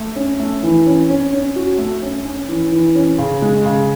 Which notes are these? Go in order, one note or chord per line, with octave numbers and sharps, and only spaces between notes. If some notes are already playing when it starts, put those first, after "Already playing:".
Already playing: A3
C#4
A3
E3
C#4
C#4
C#4
F#4
A3
C#4
C#4
E3
E3
C#4
C#3
G#3
C#3